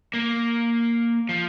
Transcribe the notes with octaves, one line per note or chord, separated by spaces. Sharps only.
A#3
F3